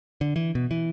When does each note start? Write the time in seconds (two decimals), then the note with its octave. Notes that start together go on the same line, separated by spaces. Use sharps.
0.21 D3
0.36 E3
0.55 B2
0.71 E3